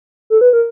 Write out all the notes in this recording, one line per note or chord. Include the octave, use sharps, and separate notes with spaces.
A4
B4
A#4